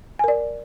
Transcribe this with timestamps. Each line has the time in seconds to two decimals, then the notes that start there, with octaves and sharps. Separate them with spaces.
0.19 G#5
0.24 A#4
0.28 D5